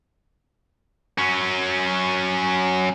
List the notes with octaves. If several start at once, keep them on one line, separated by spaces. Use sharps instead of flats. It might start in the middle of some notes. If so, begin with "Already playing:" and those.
F#3 C#4